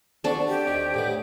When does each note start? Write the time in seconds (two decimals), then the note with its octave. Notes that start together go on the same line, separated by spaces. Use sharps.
0.24 C4 D4 F#4 A4
0.48 G4
0.67 D#2 D#3
0.94 A2 G3 B3